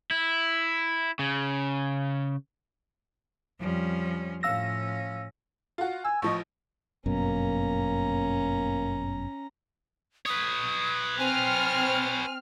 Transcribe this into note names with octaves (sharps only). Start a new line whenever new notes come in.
E4
C#3
F2 F3 G3 C#4
A2 F3 C#4 F5 E6 A#6
F4 F#4
G#5 E6
A1 F3 D#5 C#6
G1 F#2 B2 A#3 C#4 A#5
B4 C#5 D#6
C4 G#5 F6